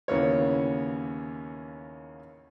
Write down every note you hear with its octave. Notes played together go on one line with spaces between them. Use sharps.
D#2 C#3 E3 A#3 B3 C#5